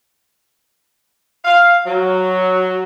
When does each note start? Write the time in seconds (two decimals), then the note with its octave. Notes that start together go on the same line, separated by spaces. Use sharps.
1.45 F5
1.87 F#3